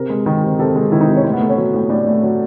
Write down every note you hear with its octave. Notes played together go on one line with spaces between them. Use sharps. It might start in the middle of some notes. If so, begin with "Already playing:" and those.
Already playing: C3 A#4
G#3
D#3
C3
C3 A4
G#3 A4
D#3 E4
D#4
C3
C#4
A2 C4
B3
A3
C#4
F#3
A2
A2 D4
A3
F#3